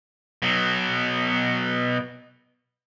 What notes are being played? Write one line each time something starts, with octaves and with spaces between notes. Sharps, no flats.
B2 F#3